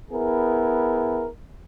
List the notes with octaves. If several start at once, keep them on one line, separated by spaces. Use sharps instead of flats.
B3 E4 G#4 A#4